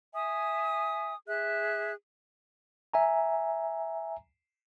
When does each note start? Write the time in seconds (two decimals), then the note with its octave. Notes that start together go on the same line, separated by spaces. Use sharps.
0.14 E5 G#5 D#6
1.27 G#4 E5 F#6
2.94 E5 G#5 A#5